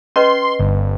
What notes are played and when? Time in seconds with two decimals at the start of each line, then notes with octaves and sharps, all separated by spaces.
0.16 C#4 B4 D#5 C6
0.59 G1